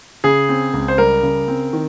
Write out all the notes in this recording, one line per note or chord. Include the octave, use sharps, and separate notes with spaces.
C#3 G#4
C4
C#2
C5
G3 A#4
C#3
C4
D#3